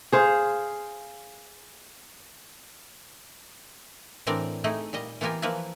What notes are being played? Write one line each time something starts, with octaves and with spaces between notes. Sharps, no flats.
G#4 C5 F5
A2 E3 C4 D4 A#4 D5
A3 D#4 E4 G4 G#4
A#2 G3 D#5
E3 B3 F4 G4 A#4 G#5
E3 F3 A#3 B4 E5 A5